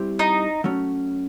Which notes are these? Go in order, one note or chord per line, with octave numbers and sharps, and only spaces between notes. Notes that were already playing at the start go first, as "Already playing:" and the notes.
Already playing: G3 C4 E4 G4 C5
D#4
F#3 A3 C#4